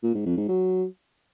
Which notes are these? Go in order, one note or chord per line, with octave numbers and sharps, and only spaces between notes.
A#2
G#2
F2
G#2
F#3